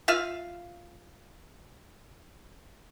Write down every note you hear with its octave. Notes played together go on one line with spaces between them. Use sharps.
F4 E5 F5